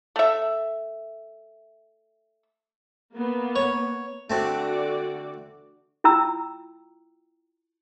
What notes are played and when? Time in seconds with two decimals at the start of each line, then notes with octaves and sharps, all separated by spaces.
0.16 A3 E5
3.14 A#3 B3
3.56 C#5
4.30 D3 A3 C4 D4 F#4 D5
6.04 E4 F4 G5 A#5 E6